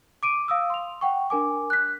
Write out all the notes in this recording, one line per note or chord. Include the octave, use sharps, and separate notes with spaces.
D6 D7 D#7
F5 D#6 E6
C6 F7
F#5 G5 C#6
D4 A#4 G#5 D6
F#6 B6